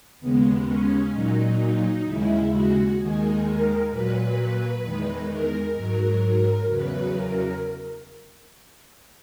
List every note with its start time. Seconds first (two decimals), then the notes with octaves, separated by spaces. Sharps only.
0.20 D#2 C#3 G#3 B3
0.67 C#4
1.12 A#2 F#3 D#4
1.59 D#4
2.05 D#2 C#3 G#3 E4
2.52 F#4
2.98 D#2 D#3 G#3 G#4
3.44 A#4
3.90 A#2 F#3 B4
4.83 E2 D#3 G#3
5.28 A#4
5.75 G#2 F#3 A#4
6.22 A#4
6.68 E2 C#3 F#3 B4
7.14 A#4